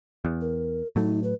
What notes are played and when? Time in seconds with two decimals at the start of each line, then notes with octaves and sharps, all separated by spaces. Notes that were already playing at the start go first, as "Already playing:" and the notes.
0.25 E2
0.41 A#4
0.96 A2 F#3 A3 D#4
1.24 B4